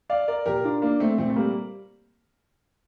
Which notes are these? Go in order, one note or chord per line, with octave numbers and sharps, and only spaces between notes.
D5 F5
A#4 D5
A#2 G4 A#4
D4 F4
A#3 D4
A3 C4
A#2 A3 C4
A3
G3 A#3